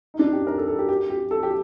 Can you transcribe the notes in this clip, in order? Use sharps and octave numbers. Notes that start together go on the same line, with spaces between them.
D#4
D4
G4
A#4
A4
A4
G4
G4
G4
A4
G4